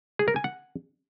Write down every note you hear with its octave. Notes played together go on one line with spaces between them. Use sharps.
G#4
A#4
G#5
F#5